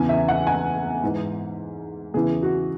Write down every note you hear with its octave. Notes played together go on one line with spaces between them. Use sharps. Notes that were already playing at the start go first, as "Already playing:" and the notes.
Already playing: E2 C#3 E3 G#5
E5
F#5
G#5
G#2 E3
E2 C#3 E3 G#4
F#4